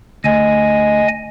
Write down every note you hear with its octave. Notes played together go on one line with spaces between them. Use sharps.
D2 D#5 G#5